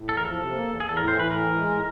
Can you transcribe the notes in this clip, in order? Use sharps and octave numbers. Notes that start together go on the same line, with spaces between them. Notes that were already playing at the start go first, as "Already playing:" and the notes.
Already playing: A2
E2 A4
A#4
F3 A4
C3
A#3
E2
E2 G#4
A4
A2 A#4
E3 C5
B4
A2 A#4
E3
G#3
A2